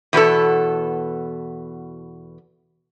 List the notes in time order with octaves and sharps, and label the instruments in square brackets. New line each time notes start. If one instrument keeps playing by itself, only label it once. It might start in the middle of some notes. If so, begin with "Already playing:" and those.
[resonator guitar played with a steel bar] E2 B2 B3 A4